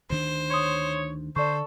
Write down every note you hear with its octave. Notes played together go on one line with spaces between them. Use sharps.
D2 D#3 D4 C5
C#5 C6 D#6
D3 A4 C5 D5 C#6